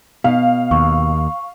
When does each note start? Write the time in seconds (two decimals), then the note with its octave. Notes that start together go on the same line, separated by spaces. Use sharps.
0.24 B2 F5
0.71 D#2 C#6